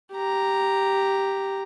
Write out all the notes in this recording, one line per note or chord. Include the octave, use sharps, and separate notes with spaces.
G4 A#5